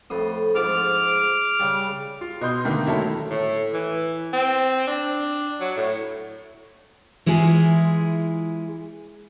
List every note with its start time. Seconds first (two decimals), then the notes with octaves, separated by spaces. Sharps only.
0.10 F2 A2 D#6
0.55 G#2 F3 G#3 D6 F6
1.60 C#3 G3
2.21 F4
2.41 B2 D#5 C6 G6
2.65 D3 D#3 A3 A#3
2.86 F#3 A3 E4 A4 E5
3.30 A2
3.74 E3
4.33 C4
4.87 D4
5.60 F#3
5.77 A2
7.26 E3 G#3 E4 F4 G#4